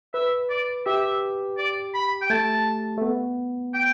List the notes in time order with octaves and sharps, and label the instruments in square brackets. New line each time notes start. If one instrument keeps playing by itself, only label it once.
[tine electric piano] B4 [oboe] E5
[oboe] D5
[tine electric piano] G4 [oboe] E5
[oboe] D5
B5
G5
[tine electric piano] A3 [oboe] A5
[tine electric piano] A3
B3
[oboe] G5